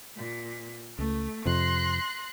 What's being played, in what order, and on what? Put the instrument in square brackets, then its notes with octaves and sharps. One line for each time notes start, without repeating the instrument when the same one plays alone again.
[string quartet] A#2
[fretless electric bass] C#2 [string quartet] A3
[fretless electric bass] F2 C3 [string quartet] C6 F#6 A#6